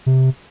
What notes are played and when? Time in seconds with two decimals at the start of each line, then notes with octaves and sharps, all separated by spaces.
0.06 C3